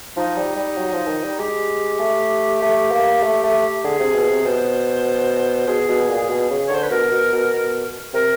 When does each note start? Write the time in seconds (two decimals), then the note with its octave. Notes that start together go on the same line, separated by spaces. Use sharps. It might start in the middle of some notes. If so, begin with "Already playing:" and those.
0.16 F3 D#4
0.37 G3
0.56 G3
0.77 F#3
0.93 F3
1.08 D#3
1.24 G3
1.38 G#3 G4
1.99 A3
2.62 A3
2.91 A#3
3.23 A3
3.43 A3
3.84 D3 G#4
3.99 C3
4.15 B2
4.30 C3
4.45 B2 C5
5.67 B2 G#4
5.88 B2
6.09 A#2
6.29 B2
6.50 C#3
6.66 C#5
6.70 D3 C5
6.82 B4
6.90 B2 A#4
7.11 B2
7.32 B2
7.52 B2
8.13 C3 A#4